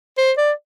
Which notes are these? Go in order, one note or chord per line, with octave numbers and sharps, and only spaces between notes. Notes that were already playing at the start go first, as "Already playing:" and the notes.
C5
D5